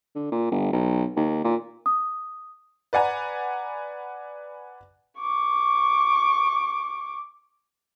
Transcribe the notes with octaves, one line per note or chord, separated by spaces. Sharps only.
D3
A#2
G1
B1
D#2
A#2
D#6
B4 D5 F#5 G#5 A#5
C#6 D6